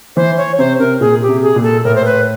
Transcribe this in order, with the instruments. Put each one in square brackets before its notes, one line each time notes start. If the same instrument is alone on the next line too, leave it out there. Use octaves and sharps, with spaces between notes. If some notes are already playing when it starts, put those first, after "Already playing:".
[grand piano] E3 [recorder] C5
[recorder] C#5
[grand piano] C3 [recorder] C5
[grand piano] C3 [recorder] A#4
[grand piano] A#2 [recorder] G#4
[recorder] G4
[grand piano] C3
[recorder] G#4
[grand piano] A#2
[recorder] A4
[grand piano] A2 [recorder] A#4
[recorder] C5
B4